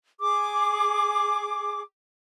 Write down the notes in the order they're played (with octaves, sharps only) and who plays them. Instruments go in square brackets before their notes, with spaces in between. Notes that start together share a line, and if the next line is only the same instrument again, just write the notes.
[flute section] G#4 D6